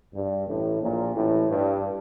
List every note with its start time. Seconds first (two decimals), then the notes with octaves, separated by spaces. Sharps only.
0.14 G2
0.47 A1 A2
0.82 A#1 A#2
1.15 A1 A2
1.49 G2